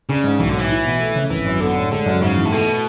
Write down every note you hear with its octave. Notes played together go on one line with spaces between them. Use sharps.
C#3 D4
G#2
B1 E3
D3
A2 E3
E4
B2
A3
C#3
G#1 E3
F#2
D3 B3
A2
D3 G#3
F#2
G#2 C#3
E3
A2
B2 A3